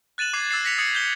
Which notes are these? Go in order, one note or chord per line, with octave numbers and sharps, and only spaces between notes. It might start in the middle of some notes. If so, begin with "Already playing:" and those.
F#6 A6 D#7 E7 F#7
D6 G#6 C7
D6 E6 A6 C7
A#6 B6 C#7 F7
D#6 G#6 C#7 F#7
G6 G#6 G7